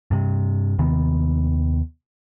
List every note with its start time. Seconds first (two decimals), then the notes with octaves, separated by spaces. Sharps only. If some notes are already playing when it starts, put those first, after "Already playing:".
0.11 G2 C3
0.79 D#2 C3 D#3 B3